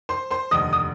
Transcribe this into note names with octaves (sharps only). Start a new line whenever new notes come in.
C5 C6
C5 C6
F1 D#2 D3 D#5 D#6
D#6